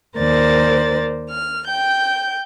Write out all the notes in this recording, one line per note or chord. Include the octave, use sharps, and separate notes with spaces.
D#2 A#4 C5 D5 A6
F6
G5 G6